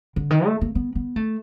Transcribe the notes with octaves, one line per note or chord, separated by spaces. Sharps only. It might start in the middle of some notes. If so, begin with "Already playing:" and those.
D3
D#3
A3
A#3
B3
B3
A3